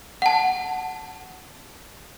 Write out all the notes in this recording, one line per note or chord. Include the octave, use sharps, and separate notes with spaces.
F#5 A5